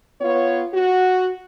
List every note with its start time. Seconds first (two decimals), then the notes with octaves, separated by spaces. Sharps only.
0.21 B3 F4 B4 C#5
0.73 F#4